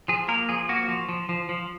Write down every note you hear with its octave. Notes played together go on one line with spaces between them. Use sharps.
F3 G#4
A#3 A#4
F3 G#4
A#3 F#4
F3
F3
F3
F3